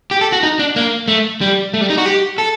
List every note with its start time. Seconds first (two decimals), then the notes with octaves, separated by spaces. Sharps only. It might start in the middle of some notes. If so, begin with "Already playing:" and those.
0.11 G4
0.21 A4
0.32 F#4
0.43 D#4
0.59 D4
0.76 A#3
1.08 A3
1.41 G3
1.74 A3
1.81 G3
1.90 D#4
1.98 F#4
2.06 G4
2.38 A4